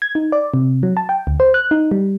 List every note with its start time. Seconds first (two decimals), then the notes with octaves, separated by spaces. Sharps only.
0.02 G#6
0.15 D#4
0.32 D5
0.54 C3
0.83 F#3
0.97 A5
1.09 G5
1.27 D2
1.40 C5
1.54 F#6
1.71 D#4
1.91 G3